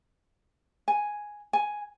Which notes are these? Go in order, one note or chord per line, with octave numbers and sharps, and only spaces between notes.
G#5
G#5